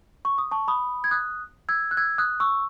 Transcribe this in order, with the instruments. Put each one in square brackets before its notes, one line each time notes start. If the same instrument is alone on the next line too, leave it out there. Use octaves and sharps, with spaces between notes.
[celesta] C#6
D#6
A5 C#6
B5 D#6
G#6
D#6 F#6
E6 G#6
F#6
E6 G#6
D#6 F#6
C#6 E6